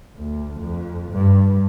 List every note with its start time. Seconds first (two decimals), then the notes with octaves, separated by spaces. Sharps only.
0.17 D2
0.60 F2
1.12 G2